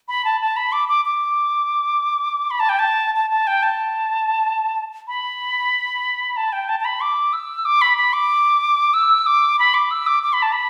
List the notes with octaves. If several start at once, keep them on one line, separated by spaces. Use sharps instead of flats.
B5
A5
A5
B5
D6
D6
D6
B5
A5
G5
A5
A5
A5
G5
A5
B5
A5
G5
A5
A5
B5
D6
E6
D6
B5
B5
D6
E6
D6
B5
D6
E6
D6
D6
B5
A5
B5